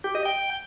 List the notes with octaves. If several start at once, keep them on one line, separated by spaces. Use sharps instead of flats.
G4
D#5
G5